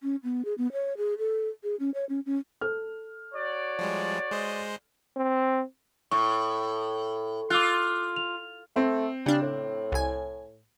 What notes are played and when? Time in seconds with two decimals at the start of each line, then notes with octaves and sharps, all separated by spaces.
0.03 C#4
0.24 B3
0.45 G#4
0.58 B3
0.72 C#5
0.97 G#4
1.18 A4
1.63 G#4
1.80 C#4
1.94 C#5
2.09 C#4
2.26 C#4
2.61 A4 F6
3.34 F#4 C#5 D5
3.79 F3 G3 G#3
4.31 G#3 C5 D#5
5.16 C4
6.11 A2 C#6
7.50 F4 D6 E6 F#6
8.16 F7
8.76 A3 C4
9.26 C#3 G3 D4
9.42 A2
9.92 C2 G#5